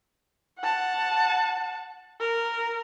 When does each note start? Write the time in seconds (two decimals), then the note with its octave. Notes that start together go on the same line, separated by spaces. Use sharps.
0.59 F#5 A5
2.20 A#4